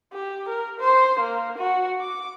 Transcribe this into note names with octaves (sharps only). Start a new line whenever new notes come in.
G4
A#4
C5
A#3
F#4
D6